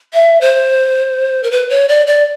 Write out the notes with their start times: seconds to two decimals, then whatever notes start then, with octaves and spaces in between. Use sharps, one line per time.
0.13 E5
0.41 C5
1.43 A#4
1.51 B4
1.70 C#5
1.89 D5
2.07 D5